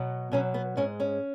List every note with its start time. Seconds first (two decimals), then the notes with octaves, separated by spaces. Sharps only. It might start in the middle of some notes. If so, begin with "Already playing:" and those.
Already playing: B2 F#3
0.32 B2 F#3 C#4
0.54 B3
0.77 G#2 G#3 C#4
1.00 C#4